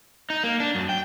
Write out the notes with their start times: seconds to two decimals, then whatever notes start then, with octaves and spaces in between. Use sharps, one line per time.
0.30 D#4
0.44 A#3
0.60 D4
0.75 F#2
0.89 G5